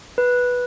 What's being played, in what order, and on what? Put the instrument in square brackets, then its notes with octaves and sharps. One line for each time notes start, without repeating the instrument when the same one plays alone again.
[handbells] B4